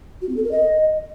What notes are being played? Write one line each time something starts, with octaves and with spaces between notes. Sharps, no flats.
F#4
C4
A4
A#4
D#5